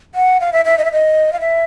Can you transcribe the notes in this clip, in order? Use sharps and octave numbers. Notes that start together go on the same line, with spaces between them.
F#5
F5
E5
E5
D#5
E5
D#5
F5
E5